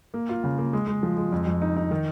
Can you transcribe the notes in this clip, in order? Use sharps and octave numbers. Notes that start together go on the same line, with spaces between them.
A#3
F4
C#3
A#3
G#3
G#3
F3
G#3
F2
F2
D#4
D#4
D#3